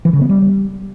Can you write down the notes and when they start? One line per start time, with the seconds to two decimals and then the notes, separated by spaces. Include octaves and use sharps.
0.05 E3
0.13 C#3
0.21 B3
0.29 G3